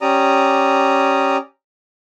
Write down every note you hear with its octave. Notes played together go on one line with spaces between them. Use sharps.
C#4 G4 D5 A#5 D#6